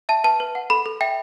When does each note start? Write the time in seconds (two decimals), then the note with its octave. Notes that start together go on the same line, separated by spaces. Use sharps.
0.09 E5 A5
0.24 B4 A5
0.40 B4
0.55 F#5
0.70 A4 B5
0.86 A4
1.01 E5 G5